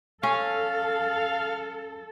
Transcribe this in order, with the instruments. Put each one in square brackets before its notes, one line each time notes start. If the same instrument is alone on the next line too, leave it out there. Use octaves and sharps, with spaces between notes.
[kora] C#4 [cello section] A4 [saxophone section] F5